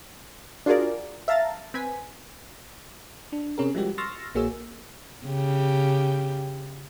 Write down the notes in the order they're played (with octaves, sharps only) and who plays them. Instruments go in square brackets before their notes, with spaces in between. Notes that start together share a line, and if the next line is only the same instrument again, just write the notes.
[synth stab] D4 F4 F#4 G#4 A#4 D5
E5 F5 A5 A#5 A6
C4 B4 G#5 B6
[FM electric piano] D4
C3 C#4 G#4 A#4
F3 G3 G#3 F#4 G4
C6 C#6 E6 F6 A6 A#6
A#1 A#3 F#4 G#4 C#5 E6
[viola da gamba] C#3 G4